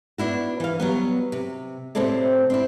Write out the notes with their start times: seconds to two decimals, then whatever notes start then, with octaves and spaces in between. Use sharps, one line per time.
0.18 B3 D4 E4 F#4
0.60 E3 F5
0.80 F#3 G3 B3
1.32 C3
1.95 A2 C3 C4 E4 A4 D5
2.50 C4 D4 E4